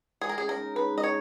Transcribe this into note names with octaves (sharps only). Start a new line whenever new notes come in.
G#3 G#4
A#4
C#3 G#4
A#4
D#4
C#3 B4
G#3 D#5
C#5